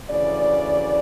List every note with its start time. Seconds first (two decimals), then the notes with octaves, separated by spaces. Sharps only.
0.10 D2 C#3 E3 D5